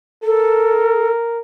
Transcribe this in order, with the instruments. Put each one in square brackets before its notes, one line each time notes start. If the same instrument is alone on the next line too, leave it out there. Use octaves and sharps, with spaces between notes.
[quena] A4 [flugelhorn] A#4